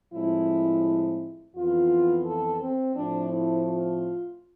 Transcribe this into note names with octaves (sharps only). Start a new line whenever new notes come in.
A2 F3 G#3 C4 E4
F2 E3 B3 F4
A4
C4
A2 F3 A3 C4 D4
E4
F4